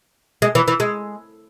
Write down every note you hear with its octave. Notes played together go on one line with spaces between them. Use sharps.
G#3
E3
E3
G#3